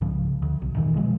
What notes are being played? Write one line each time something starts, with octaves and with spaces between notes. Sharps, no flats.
C2 G#2 C#3 F3
D2
B1
F2 A#2 D#3 E3
B2 F3 F#3 G#3